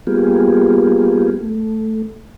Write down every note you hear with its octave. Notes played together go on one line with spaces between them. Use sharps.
G3 A#3 B3 F4 G4 G#4
A3